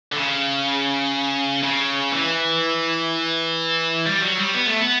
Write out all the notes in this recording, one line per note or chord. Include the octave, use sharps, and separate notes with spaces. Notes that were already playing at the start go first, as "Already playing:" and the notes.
D3
C#3
C#3
E3
G3
F#3
G3
B3
A3
B3